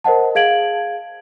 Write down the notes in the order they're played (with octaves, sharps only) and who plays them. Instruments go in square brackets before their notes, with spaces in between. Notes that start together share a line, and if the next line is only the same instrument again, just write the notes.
[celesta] A#4 C5 D#5 F#5 A5
G#4 F5 G#6 D7 F#7